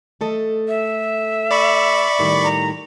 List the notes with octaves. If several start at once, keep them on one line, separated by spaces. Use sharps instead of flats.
A3 A4 D#5
E5
D5 B5 C#6
A2 D#3 G3
A#5